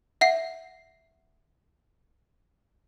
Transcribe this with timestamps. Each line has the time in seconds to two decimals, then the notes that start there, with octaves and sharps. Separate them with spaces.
0.21 E5 F#5 C7